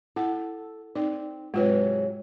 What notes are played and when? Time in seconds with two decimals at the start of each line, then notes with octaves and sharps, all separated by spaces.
0.16 E4 A4 F#5
0.95 C4 D#4 D5
1.54 G#2 C3 F#3 G#3 F4 B4